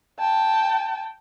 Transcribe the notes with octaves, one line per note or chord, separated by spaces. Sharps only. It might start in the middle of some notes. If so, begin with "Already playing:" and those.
G5 A5